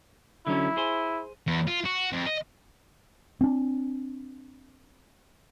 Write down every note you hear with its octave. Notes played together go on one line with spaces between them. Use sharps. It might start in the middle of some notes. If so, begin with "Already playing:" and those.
D3 F#3 C#4 E4
G#4 C5
E2
F4
F#4
F2
D#5
C4 D4